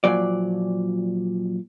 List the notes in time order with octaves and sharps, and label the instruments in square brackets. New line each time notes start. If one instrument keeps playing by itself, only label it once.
[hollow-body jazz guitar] A#2 F3 F#3 D5